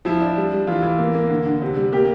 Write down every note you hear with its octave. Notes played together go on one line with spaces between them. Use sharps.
F3 E4
D4
G3
G3
E3 F4
E3
A#3
A#3
D3
D3
C3
G3
A#3 G4